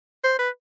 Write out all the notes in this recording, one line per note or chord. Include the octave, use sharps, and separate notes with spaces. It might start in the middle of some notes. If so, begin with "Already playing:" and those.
C5
B4